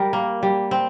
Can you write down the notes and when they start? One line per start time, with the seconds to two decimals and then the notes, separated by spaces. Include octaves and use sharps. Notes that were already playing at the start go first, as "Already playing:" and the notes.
Already playing: G3 A#4
0.13 A#3
0.43 G3
0.71 C4